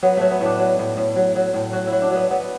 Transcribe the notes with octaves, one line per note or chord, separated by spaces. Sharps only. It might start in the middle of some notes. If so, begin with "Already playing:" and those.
F#3 B3
F#3 A3
B3
A2 D4
F#3
A2
A2
F#3
F#3
A2
F#3 F#4
E4
F#3
D4
F#3 B3
F#3 B3